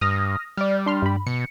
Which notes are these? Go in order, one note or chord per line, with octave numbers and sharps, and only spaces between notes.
G2 D#6 F6 A#6
G3 D5 F6
D4 C6 F6
G2 B5
B2 C#7